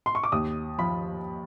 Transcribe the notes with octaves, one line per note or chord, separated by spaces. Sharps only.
C6
C#6
D6
D#2 D#6
F3 B5